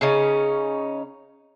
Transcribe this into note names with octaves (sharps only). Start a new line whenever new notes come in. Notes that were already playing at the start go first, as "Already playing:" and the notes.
C#3 C#4 D#4